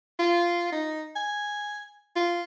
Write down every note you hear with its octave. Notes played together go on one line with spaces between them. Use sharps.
F4
D#4
G#5
F4